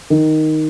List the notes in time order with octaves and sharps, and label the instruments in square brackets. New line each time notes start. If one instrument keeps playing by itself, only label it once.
[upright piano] D#3